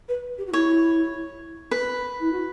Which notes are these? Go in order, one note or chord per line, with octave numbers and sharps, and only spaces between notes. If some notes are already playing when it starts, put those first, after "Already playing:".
B4
G4
F#4
E4 C#5
B4
E4
F#4